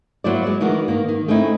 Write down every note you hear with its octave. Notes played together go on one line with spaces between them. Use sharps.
F#3 A#3 E4 C5 D5
G#3 D5
D2 D#3 E3 F#4 A#4
D#3 A#3
D#3
A3 C4 C#4 D#4 E4